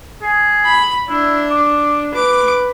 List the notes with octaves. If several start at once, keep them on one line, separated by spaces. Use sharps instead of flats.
G#4
B5
D4 E4
D6
B4 D6